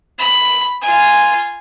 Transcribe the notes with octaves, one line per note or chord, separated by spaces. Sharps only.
B5
F4 G#5